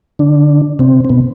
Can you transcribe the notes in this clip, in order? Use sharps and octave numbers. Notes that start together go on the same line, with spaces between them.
D3 D4
C3 C4
C4
B2 B3